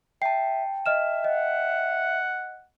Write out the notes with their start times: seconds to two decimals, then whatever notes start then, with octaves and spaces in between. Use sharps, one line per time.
0.22 E5 G5 A5 C7
0.86 D#5 E5 F6 E7
1.24 D#5 F#5